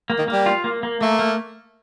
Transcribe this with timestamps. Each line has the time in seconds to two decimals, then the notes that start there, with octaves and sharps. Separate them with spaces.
0.10 A#3
0.18 D#3
0.28 G3 A#3
0.46 F4
0.64 A#3
0.83 A#3
1.01 A3 A#3
1.19 A#3